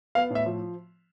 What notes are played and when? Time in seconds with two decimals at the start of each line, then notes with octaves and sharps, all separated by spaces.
0.15 B3 F5
0.30 A2
0.35 E5
0.46 F3